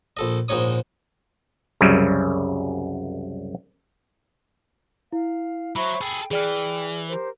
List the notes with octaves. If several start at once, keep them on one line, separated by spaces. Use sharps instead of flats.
A#1 A4 D#5
A#1 G#2 G#3 D#4 C#5 D#6
C2 F#2 C#3 F#3 G3
E4 F5
F#3 C5 E5 B5 C#6
G#4 A4 G5
E3 G#4 D5 G5 F6
G4 A#4 C5